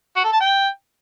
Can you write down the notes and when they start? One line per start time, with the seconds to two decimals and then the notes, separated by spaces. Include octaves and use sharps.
0.16 F#4
0.24 A4
0.32 A5
0.40 G5